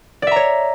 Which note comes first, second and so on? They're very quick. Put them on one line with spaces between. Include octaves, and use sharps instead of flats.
D5 E5 A#5 C#5